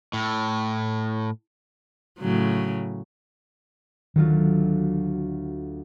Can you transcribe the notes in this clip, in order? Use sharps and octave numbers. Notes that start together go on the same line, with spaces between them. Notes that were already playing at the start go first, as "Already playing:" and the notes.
A2
A2 C#3 F#3
D2 D#3 F#3 F4